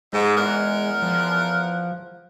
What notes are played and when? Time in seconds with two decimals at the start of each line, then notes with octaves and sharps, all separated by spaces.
0.13 G#2 G#3
0.36 E2 A#4 F#5
1.02 F3